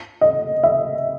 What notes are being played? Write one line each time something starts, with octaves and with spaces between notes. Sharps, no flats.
D#5
E5